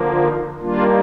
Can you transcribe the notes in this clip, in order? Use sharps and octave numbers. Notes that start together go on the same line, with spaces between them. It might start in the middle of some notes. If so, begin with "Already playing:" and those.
Already playing: D3 F3 A#3
D#4
D#3 G3 A#3 D4 F4